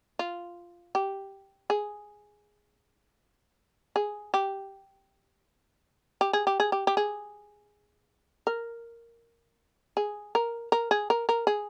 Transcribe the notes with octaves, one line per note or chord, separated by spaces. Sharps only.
F4
G4
G#4
G#4
G4
G4
G#4
G4
G#4
G4
G4
G#4
A#4
G#4
A#4
A#4
G#4
A#4
A#4
G#4